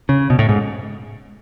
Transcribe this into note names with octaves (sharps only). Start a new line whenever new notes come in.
C#3
B2
A2
G#2